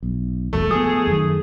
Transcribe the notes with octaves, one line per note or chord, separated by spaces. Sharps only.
B1
E1 A#1 G2 A3
F3 B3 G#4
F#2 D#3